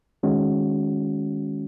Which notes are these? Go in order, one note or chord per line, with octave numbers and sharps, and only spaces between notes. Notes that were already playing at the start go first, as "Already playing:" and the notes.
D#3 G#3 C#4 F#4